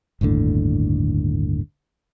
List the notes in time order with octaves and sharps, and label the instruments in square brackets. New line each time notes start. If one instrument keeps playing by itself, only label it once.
[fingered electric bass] G1 D#2 A2 D3